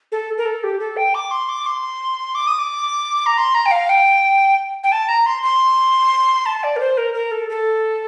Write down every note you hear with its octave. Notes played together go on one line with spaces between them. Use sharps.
A4
A#4
A4
G4
A4
G5
D6
C6
D6
C6
D6
D#6
D6
A#5
C6
A#5
G5
F5
G5
G5
A5
A#5
C6
C6
A5
D5
A#4
C5
A#4
A#4
A4
A4